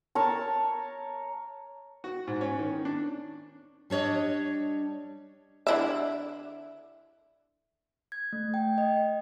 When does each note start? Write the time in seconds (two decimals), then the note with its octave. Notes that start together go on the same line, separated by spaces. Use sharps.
0.15 A#4 C#5 A5
2.04 F#4
2.27 G#2
2.41 C#4
2.59 D#3
2.85 D4
3.90 G3 D4 C#5 D#5
5.67 D3 E4 E5
8.12 G#6
8.33 A3
8.54 G5
8.78 D#5